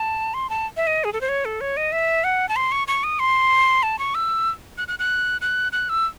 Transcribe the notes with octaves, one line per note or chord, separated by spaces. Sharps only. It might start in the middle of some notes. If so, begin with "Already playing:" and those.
Already playing: A5
C6
A5
E5
D#5
G#4
A4
C5
C#5
A4
C#5
D#5
E5
F#5
A5
C6
C#6
C#6
D#6
C6
A5
C#6
E6
F#6
F#6
F#6
F#6
F#6
E6